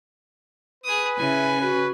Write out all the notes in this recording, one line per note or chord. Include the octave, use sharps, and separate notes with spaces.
G#4 B4 D#6
C#3 E4 G#5
F#4 B4